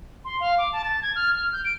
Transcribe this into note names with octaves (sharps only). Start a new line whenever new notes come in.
C6
F5
D6
A5
A6
G#6
F6
F6
G6
D7